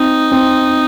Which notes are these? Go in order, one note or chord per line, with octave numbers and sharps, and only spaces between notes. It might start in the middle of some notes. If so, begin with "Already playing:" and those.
Already playing: C4 D#4
C4